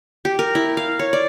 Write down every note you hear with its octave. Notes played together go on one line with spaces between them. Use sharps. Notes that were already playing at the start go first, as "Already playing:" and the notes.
G4
A#4
E4
F5
C#5
D5